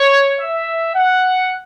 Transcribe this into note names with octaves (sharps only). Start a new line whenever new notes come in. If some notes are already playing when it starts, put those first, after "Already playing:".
Already playing: C#5
E5
F#5